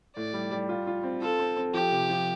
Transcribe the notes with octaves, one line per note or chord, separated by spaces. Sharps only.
A2 D5
G3
G3
F4
F4
C4
F4 A4
C4
C4
F3 G4
C3
F3